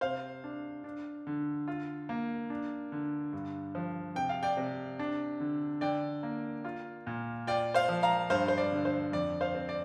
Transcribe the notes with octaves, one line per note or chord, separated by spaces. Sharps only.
C3 C5 F5
D4
D4
D3
F4
A#3
D4
D3
G2
F3
C3 G5
F5
D5 G5
C3
D4
D3
D3 D5 G5
A#3
F4
A#2
F4 D5 G5
C5 F5
F3
F5 A#5
G2 C5 F5
C5
D5
D3
C5
F2 D5
C5 F5
C4
D5